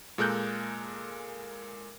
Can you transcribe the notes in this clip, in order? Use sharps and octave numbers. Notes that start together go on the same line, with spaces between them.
A#2 G#3 A4 A#4 F#6 G6